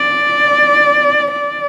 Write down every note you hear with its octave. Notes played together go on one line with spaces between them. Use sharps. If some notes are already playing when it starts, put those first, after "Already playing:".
Already playing: D5
D5